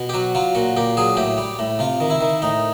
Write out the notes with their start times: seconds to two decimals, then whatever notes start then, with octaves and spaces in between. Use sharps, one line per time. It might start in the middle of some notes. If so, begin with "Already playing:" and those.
Already playing: B2
0.09 G4
0.14 F#3 F#4
0.35 F#3 F4
0.55 A#2 F#4
0.77 A#2 G4
0.97 F#3 G#4
1.17 A2 G4
1.38 G3
1.59 A2
1.79 C3 F4
2.00 D#3
2.10 E4
2.21 D#3
2.42 A2 D#4